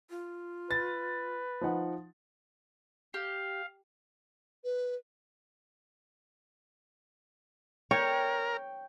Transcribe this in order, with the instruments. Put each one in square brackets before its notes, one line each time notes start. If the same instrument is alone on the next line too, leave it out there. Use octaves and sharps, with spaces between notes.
[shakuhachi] F4
[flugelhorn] B4 [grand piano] A6
[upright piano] F3 D#4 F#5
[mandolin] G4 [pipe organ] F5
[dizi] B4
[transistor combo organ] A#4 [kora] C#5 [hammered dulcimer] G5